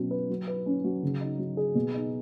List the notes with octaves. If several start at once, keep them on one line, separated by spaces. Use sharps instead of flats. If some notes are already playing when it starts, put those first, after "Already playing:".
Already playing: B2 F#3 C#4
B4
F#3
B4
C#4
F#3
C#3
D#4
F#3
G#4
B2
D#4